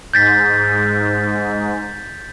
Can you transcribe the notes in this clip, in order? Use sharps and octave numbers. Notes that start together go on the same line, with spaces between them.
G#2 G6 A6 B6